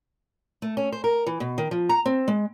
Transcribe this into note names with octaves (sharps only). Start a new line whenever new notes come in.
A3
C#4
C5
A#4
E3
B2
D#3
F3
A#5
C4
G#3